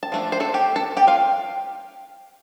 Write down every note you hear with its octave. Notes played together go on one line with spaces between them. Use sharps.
A5
F3 A3 D4
C5
A3 A4
G4
A4 A5
G4 G5
F4 F5